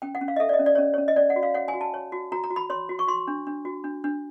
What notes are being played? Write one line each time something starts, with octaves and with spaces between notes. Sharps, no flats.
C#4 G5
F#5
C#4
F5
D#5
A4 E5
D5
D#5
C#4
D5
C#4 C#5
C#4 C#5
D#5
C#4 D5
F#5
F#4
F5
C#5 F#5
G#5
F#4
A5
C#5
F#4
F#4 A#5
A#5
F#4
B5
C#5 C6
F#4
C#6
F#4 C6
D4
D4
F#4
D4
D4